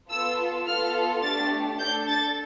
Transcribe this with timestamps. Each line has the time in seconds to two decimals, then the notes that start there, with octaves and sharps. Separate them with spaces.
0.10 B3 F4 A4 E6
0.67 B3 F4 A4 F6
1.23 A3 D4 G4 A6
1.80 D4 A4 G6
2.08 A6